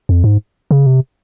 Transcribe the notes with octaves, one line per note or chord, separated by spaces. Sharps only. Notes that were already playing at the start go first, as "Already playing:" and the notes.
F2
G#2
C#3
C3